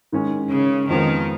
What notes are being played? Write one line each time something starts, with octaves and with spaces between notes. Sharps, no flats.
D#3 G#3 C#4
C#3
F2 D#3 F3 G#3 B3